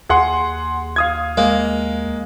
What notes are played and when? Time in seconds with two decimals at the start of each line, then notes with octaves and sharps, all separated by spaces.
0.09 D#2 G#4 F#5 C6
0.96 F5 D#6 G#6
1.37 G#3 A#3